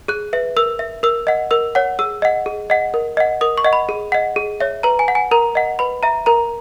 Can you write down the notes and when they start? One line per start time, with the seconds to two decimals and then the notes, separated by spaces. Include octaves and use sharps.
0.08 G#4 F#6
0.33 B4 E5
0.57 A#4 E6
0.79 E5
1.03 A#4 E6
1.27 D#5 F#5
1.51 A#4 E6
1.75 C#5 F#5
1.99 G#4 E6
2.22 D#5 F#5
2.46 G#4
2.70 D#5 F#5
2.94 A#4
3.17 D#5 F#5
3.41 A#4 D#6
3.58 C#6
3.64 D#5 F#5
3.73 B5
3.89 G#4
4.12 D#5 F#5
4.36 G#4
4.60 C#5 E5
4.83 B4 A#5
4.99 G#5
5.08 F#5
5.15 G#5
5.31 A#4 A#5
5.55 D#5 F#5
5.79 B4 B5
6.03 E5 A#5
6.26 A#4 A#5